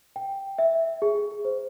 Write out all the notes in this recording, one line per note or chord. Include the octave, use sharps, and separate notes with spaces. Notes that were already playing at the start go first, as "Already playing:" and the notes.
G5
E5
G#4
C5